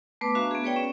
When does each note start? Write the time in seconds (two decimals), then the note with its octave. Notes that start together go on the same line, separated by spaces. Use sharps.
0.21 A3 B3 B4 D6
0.35 D4 F#4 E5 F5 A#5 C#6
0.51 B3 G#4
0.64 G#4 B4 C#5 D5 G5
0.76 C#4